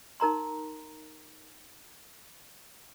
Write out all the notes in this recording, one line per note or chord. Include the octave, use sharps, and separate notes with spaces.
D#4 A#4 A#5 C6